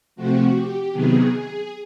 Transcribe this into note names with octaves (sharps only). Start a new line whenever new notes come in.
C3 F3 A3 C4 F#4
G4
C3 D#3 F#3 B3 G#4
G#4